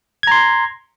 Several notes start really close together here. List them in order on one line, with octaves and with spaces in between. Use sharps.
G#6 A#5 C6